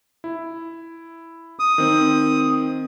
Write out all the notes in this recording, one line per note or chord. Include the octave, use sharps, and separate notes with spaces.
E4
D#6
D#3 C4